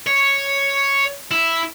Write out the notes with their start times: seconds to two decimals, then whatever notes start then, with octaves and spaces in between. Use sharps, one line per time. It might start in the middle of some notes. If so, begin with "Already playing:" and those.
0.06 C#5
1.31 E4